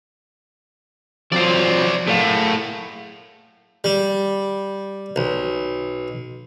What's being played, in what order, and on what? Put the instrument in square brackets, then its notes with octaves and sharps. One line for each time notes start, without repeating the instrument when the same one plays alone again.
[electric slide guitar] F3 F#3 C4 [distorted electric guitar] C5 D5
[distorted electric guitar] A2 [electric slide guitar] G#4 A#4 F5
[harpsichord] G3
B1